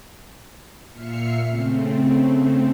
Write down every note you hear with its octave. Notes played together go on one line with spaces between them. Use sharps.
A#2 E5 F6 C7 C#7
C#3 A3 C4